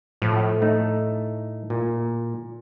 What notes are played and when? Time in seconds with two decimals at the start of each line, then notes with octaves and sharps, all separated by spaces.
0.22 A2 F3
0.62 A3 D#4
1.70 A#2